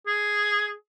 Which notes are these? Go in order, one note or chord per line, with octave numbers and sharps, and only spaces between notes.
G#4